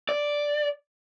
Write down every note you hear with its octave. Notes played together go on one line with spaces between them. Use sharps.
D5